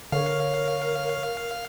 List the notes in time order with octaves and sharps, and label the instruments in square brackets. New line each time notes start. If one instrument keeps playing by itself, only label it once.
[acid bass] D3 [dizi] A#4 [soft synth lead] C#5 [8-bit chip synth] F5